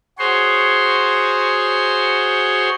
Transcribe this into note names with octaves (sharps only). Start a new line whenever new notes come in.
F#4 G#4 C5 C#5 C6